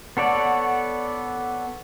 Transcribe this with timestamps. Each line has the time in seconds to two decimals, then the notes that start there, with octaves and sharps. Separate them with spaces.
0.17 B3 A4 C#5 D5 F#5